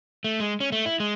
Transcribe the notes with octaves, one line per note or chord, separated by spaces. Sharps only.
A3
G#3
C#4
A3
E4
G#3